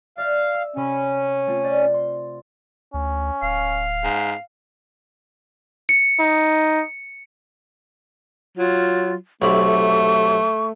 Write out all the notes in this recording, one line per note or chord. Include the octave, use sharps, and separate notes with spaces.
D5 E5 F5 F#6
E6
C3 C#4 B5
A3 C4 F4
C5 D5 F5
C6
D2 C#4
D1 F5
G#2
C#7
D#4
F#3 F4
B1 C3 A3 B5 C#6